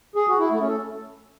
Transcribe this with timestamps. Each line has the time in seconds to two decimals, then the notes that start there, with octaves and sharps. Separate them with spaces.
0.16 G#4
0.28 F#4
0.39 E4
0.51 A3
0.60 C#4
0.69 A4